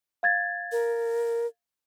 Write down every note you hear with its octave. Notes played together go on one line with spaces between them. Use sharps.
F5 G#6 A6
A#4